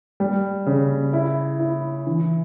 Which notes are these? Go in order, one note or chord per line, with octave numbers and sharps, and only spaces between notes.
G3
C#3
E4
E4
E3